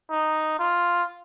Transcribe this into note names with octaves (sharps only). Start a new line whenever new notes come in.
D#4
F4